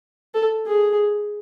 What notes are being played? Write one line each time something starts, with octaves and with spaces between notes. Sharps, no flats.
A4
G#4